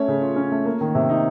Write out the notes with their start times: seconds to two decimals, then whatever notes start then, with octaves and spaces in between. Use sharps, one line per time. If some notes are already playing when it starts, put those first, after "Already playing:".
Already playing: A3 C#4 C#5
0.08 C#3
0.21 F4
0.36 C#4
0.52 A3
0.65 A#3
0.81 D#3
0.95 C3
1.09 D#4